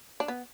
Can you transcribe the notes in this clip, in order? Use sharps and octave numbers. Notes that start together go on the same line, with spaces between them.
D4
B3